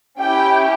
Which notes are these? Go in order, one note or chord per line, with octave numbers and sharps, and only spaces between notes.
C#4 E4 G4 G5